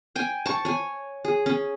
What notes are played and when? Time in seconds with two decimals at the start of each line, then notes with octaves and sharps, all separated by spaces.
0.16 G5 G#5
0.46 A5 C#6
0.65 C#5 G#5
1.25 G#4
1.46 C#4